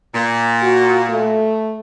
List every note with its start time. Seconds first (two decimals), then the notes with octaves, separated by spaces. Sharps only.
0.15 A#2
0.63 F#4
1.10 A3